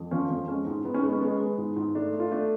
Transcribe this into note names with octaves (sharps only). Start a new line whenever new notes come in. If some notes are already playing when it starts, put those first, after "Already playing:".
Already playing: F2
F3 C#4
F2
G#3 C#4
G#2
G#2 B3
C#4
G#3 B3
C#4
G#3 B3
C#4
G#3 B3
G#2
G#2
A3 D4
A3
F4
A3 D4